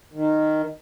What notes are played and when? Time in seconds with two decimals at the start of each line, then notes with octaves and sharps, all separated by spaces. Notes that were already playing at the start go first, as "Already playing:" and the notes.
0.13 D#3